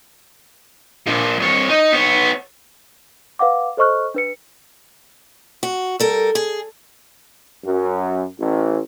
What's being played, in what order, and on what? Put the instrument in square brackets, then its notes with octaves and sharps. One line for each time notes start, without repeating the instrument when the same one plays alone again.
[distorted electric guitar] A#2 F3
C2 C#5
D#4
B3 C#5
[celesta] B4 F5 F#5 D6
A4 C5 D#5 C#6 F6 F#6
D4 B4 C#7
[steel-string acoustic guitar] F#4
G3 A4 A#4
G#4
[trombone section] F#2
A1